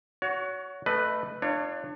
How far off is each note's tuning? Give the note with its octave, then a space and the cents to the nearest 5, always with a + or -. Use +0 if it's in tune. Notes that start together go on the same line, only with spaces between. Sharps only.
F#4 +0 C#5 +30
A3 +0 B4 +5 D#5 -30
D4 +30 F4 -35 C#5 +0